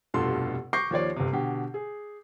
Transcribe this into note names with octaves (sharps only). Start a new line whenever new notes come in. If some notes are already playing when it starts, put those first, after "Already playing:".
F1 G2 B2 F4 A4 C6
C#6 D6 G6 A#6 C7
D#2 F3 C#5 D5
G1 C3
B2 D3 G4
G#4